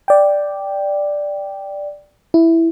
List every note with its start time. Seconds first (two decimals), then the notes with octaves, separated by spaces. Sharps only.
0.08 D5 G5
2.34 E4